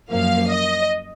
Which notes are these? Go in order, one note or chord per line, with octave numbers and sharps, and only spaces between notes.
F#2 F3 A#3 F5
D#5